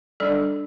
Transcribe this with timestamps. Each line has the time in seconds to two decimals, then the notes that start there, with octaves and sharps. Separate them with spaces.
0.20 G3 D4 A4 D5